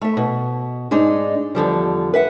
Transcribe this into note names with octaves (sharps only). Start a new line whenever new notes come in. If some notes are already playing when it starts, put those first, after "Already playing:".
A3 E5
B2
G#2 G#3 D4 D#4
E2 D3 F3 G3
B4 E5 F#5